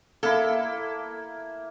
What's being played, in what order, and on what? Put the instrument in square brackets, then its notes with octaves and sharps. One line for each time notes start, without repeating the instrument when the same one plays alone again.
[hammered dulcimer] A#3 E4 [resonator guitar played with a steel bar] A4